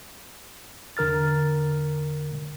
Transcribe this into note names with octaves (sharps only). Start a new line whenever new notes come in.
E2 D3 A#4 F6 A6